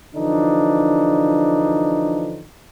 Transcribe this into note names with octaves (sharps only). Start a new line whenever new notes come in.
D3 E3 F3 D4 D#4